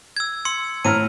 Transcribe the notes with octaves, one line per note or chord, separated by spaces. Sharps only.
E6 G#6
C6 E6 C#7
A2 A#5 F6 D#7